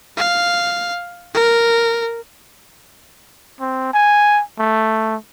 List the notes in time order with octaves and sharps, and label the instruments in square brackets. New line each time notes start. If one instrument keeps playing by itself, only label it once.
[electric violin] F5
A#4
[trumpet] C4
G#5
A3